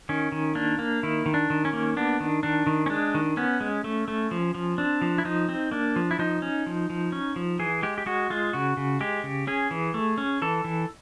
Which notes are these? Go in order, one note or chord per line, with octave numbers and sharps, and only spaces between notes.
D#3 C#4
D#3
A#3 D4
A#3
D#3 E4
D#3
D4
D#3
C#4
A#3
B3 D4
D#3
D#3 D4
D#3
C#4
G#3 D4
D#3
B3 C#4
G#3
A3
A3
F3
F3
C4 D4
F3
E4
F3 D#4
C4
A#3 D4
F3
E4
F3 D#4
C#4
F3
F3
C#4
F3
E3 G#4
G#3 G4
G4
G#3 F#4
G#3 F4
C#3 F#4
C#3
G#3 G4
C#3
C#4 G#4
E3
A3
C#4
E3 A4
E3